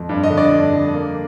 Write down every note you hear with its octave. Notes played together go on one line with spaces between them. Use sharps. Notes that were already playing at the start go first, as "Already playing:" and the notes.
Already playing: F2
G2
D#5
D3
D5
G2
D3
A#3